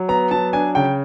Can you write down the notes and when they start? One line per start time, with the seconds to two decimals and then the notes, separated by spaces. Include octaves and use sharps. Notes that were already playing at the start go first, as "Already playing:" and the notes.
Already playing: F#3
0.09 B3 A#5
0.31 F#3 A5
0.53 D4 G#5
0.75 C#3 G5